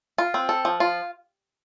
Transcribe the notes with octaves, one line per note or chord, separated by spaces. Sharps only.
F4
C4
A4
F3
F4